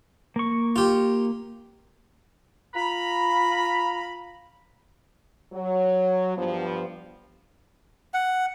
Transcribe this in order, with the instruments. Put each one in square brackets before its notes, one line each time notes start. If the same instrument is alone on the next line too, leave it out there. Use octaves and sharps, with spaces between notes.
[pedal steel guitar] A#3 C#6
[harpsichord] F4 G4
[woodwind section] F4 A#5 B5
[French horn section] F#3
G2 F3 B3
[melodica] F#5